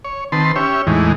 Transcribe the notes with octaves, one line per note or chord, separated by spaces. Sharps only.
C#5
D#3 C4 B4 A5 C6
C#4 G4 C#5 E5
E2 A2 E3 G#3 D#4